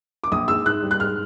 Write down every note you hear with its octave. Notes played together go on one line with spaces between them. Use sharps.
D6
A#1 D#6
G#2 E6
G#2 F#6
G3
F#6
G#2 F6